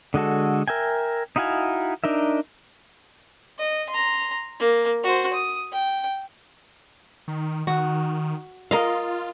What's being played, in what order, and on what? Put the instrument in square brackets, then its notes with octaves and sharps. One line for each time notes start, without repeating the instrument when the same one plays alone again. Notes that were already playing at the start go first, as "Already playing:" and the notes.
[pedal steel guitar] D3 G#3 F#4 A4
A#4 E5 G5 G#5
D#4 E4 F#4 F5 G#5
D4 D#4 A#4 E5
[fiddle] D#5
A#5 C6
A#3
F#4 C5
D#6
G5
[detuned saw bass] D#3
[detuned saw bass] D#3 [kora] F#4
[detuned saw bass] F4 [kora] A#4 D#5 F5